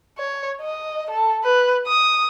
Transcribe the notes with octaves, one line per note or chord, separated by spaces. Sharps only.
C#5
D#5
A4
B4
D#6